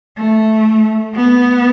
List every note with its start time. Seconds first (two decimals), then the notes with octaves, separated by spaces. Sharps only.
0.17 A3
1.15 B3